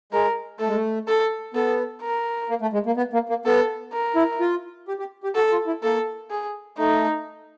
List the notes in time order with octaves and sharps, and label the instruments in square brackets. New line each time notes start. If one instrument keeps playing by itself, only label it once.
[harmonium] G#3 [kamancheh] A#4
[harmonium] A3 [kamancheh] A4
[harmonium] G#3
A3
[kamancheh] A4
[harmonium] B3 [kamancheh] A4
[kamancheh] A#4
[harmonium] A#3
A3
G#3
A#3
B3
A#3
A#3
[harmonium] B3 [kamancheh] A4
[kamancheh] A#4
[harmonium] E4
F4
G4
G4
G4
[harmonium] F#4 [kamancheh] A4
[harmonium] F4
E4
[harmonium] A#3 [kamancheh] A4
[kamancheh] G#4
[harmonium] A3 [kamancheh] D#4